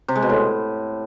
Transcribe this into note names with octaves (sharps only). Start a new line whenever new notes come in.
C3
G#3
B2
A2